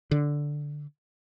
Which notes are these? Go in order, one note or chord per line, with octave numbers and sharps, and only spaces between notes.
D3